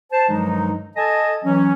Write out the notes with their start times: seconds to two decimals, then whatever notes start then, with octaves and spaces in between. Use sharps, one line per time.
0.11 C5 A5
0.29 G2 D#3 F3 F#3 G#3 D#4
0.96 A4 D#5 G#5 A5
1.43 E3 F#3 C#4